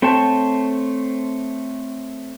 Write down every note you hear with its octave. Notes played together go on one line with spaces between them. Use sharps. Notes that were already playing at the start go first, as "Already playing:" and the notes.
A3 C4 C5 C#5 G5 A5